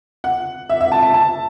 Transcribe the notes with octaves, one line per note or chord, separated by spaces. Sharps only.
F#5
E5
E5
A5
A5
A5